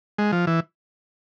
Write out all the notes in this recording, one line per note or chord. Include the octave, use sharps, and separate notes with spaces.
G#3
F3
E3